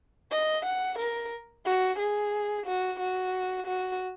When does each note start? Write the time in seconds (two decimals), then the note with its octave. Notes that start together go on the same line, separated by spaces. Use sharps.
0.32 D#5
0.65 F#5
0.98 A#4
1.66 F#4
1.99 G#4
2.66 F#4
2.99 F#4
3.67 F#4